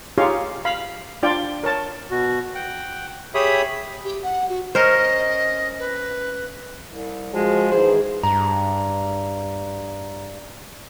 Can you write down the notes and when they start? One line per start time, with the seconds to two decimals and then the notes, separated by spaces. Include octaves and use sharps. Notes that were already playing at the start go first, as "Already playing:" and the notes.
0.18 D#4 F4 G4 G#4 C#5 F5
0.65 F5 B5
1.23 D4 F4 D5 G5
1.64 A#4 C#5 A5
2.11 B2 F#4
2.55 F#5 G5
3.34 G4 G#4 C#5 E5 B5 D#6
4.04 G4
4.23 F#5
4.49 F#4
4.75 C#4 A#4 C5 D#5
5.78 B4
6.90 C2
7.34 F3 G#3 F#4 G#4
7.72 G#2 D#3 E3 G#4 C5
8.23 G2 A#5